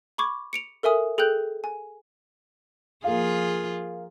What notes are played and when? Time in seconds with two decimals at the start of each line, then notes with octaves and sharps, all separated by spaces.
0.18 B5 C#6 D6 G#6
0.53 C#7 D7 F7
0.83 A4 A#4 E5 G#5 D#6
1.18 G#4 A4 G5 F#6 G6
1.64 G#5
3.04 F3 A#3 F4 G#4 F5